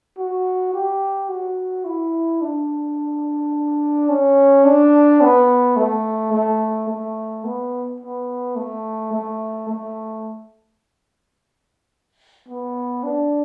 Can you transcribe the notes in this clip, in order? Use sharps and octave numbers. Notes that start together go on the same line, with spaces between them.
F#4
G4
F#4
E4
D4
C#4
D4
B3
A3
A3
A3
B3
B3
A3
A3
A3
B3
D4